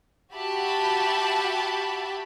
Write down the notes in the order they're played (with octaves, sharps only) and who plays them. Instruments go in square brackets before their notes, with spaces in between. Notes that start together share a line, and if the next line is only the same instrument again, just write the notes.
[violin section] F#4 G4 E5 A5 B5